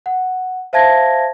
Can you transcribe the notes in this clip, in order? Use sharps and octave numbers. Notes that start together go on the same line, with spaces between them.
F#5
C5 E5 F5 A5 G#6 A#6